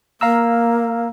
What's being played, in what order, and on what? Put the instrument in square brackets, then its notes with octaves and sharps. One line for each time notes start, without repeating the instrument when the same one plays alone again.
[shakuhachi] A#3 [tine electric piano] F5 A#5 E6